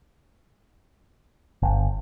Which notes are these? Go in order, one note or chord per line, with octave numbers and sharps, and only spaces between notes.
G1